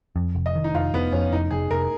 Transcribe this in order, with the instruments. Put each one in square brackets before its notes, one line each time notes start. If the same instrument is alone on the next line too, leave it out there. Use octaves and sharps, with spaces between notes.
[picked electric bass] F2
F1
[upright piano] D#5
[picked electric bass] D#3
[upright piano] D#4
[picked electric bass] F1 [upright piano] F4
[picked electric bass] F1 [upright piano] B3
[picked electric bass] F2 [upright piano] C#4
[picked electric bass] F1 [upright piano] D#4
[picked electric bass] F1 [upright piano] G#4
[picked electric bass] F1 [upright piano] A#4